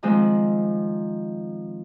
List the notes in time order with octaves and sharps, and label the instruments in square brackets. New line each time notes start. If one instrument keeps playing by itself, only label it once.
[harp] D#3 F3 G#3 C4